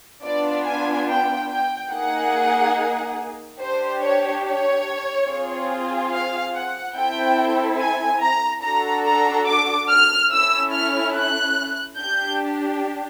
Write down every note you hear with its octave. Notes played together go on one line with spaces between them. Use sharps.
B3 D4 F4 D5
G#5
G5
G5
A#3 D#4 G#4 F#5
D4 G4 C5
C#5
C#5
C4 F4 G#4
F5
F#5
C4 E4 A4 G5
G#5
A#5
D4 F#4 A4 A#5
A#5
D6
F6
C#4 E4 A4 E6
F6
F#6
D4 G4 G6